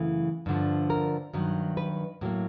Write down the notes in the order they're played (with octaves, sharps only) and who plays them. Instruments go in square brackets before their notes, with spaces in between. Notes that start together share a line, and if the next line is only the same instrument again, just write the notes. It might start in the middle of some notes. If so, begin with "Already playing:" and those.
Already playing: [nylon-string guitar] F#2 C#3 E3 A3
G2 D3 F3
A#4
G2 D#3 F#3
B4
A2 F#3 A#3